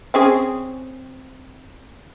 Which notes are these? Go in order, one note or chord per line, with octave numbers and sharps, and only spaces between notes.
C4 C#4 G#4